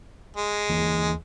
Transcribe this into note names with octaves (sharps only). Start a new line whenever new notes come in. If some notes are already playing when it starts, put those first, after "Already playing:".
G#3
D#2 E3 A#3